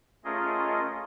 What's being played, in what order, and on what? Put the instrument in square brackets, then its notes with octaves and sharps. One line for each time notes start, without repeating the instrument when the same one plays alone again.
[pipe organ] A3 C#4 F4 G#4 A#4 D#5